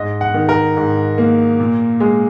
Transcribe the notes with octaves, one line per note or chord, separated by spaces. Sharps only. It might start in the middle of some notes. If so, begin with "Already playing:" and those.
Already playing: G#2 D#5
F#5
D#3
A#4
G#2
A#3
A#2
G#3